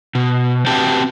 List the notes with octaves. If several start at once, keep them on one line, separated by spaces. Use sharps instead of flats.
B2
C4 F#4 G4 B4 G5 A5